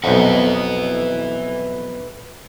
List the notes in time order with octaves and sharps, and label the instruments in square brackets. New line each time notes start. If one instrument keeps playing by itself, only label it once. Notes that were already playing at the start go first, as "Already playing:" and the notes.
[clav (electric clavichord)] B1 F2 [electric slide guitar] B4 E5 F#5